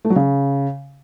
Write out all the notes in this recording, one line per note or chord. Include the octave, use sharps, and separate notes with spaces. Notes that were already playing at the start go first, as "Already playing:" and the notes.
A3
F#3
C#3